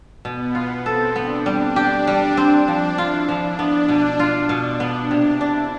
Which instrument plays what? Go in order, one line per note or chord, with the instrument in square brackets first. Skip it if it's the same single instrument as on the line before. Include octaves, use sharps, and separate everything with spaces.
[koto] B2 [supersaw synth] B3
[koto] F4
[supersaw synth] C4 [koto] A4
[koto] B3 [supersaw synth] D4
[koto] G3 [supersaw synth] D4
[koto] G4
G3
C4
[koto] F3 [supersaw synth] D4
[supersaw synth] E4 [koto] F4
[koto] F3 [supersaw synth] D4
[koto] B3
B2
F4
[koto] B2 [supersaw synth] D4
[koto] B3
[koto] C3 [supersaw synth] D4
[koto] D4 [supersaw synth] E4